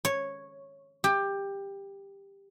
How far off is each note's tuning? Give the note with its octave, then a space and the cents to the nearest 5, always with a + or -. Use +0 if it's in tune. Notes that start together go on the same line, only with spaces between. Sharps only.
C#5 -5
G4 +15